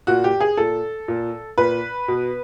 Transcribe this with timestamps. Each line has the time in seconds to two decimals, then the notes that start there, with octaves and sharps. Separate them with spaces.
0.07 A#2 F#4
0.24 G4
0.40 G#4
0.57 A#2 A4
1.08 A#2
1.58 A#2 B4
2.08 B2